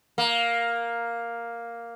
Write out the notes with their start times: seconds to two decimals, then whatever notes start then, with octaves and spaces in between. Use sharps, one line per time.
0.18 A#3